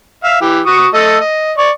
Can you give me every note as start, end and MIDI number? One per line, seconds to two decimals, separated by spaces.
0.24 0.38 76
0.24 0.38 77
0.41 0.61 52
0.41 0.61 67
0.66 0.87 66
0.66 0.87 85
0.66 0.87 87
0.94 1.17 57
0.94 1.17 69
0.94 1.17 75
1.21 1.52 75
1.58 1.70 74
1.58 1.70 85